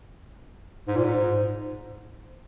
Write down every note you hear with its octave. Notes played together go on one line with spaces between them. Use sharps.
G#2
A#2
G#2